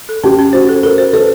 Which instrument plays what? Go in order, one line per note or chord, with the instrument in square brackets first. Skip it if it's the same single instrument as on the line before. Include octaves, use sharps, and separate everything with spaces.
[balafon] A4
[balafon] C#4 [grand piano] G4
[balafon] C#4
[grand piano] F#4 [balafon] C5
[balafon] A4
[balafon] A4 [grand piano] A#4
[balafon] C5
[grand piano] A4 [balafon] B4